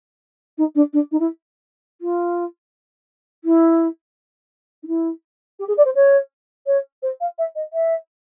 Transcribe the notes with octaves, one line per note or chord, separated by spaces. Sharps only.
D#4
D4
D4
D#4
E4
F4
E4
D#4
E4
G4
G#4
D5
C5
C#5
C#5
C5
F5
E5
D#5
E5